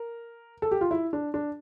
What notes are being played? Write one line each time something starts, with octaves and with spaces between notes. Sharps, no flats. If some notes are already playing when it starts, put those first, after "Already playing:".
Already playing: A#4
A4
G4
F4
E4
D4
D4